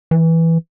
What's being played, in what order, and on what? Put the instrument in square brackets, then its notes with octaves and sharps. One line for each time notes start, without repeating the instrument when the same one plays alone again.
[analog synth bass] E3